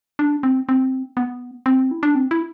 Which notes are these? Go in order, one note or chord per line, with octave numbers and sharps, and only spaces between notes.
D4
C4
C4
B3
C4
E4
D4
C4
E4